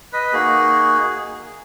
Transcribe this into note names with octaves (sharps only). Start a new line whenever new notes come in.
B4 D#5
A#3 D#4 F#4 G#4